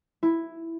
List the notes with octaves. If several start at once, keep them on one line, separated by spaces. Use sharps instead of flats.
E4